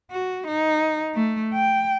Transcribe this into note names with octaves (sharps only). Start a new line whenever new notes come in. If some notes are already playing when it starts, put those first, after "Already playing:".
F#4
D#4
A3
G5